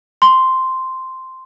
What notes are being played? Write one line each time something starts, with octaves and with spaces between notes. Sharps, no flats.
C6